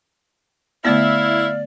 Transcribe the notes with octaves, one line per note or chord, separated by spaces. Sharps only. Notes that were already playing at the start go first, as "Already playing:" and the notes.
D3 A3 B3 E4 D5 F5